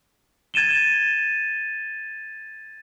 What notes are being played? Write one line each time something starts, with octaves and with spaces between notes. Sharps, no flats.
G#6 A6 D#7 E7 G7